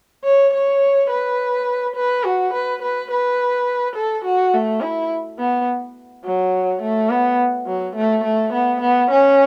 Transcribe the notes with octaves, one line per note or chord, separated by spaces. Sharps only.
C#5
C#5
B4
B4
F#4
B4
B4
B4
A4
F#4
A3
E4
B3
F#3
A3
B3
F#3
A3
A3
B3
B3
C#4